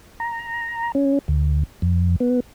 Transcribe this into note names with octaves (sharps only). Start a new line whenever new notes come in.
A#5
C#4
D2
F2
B3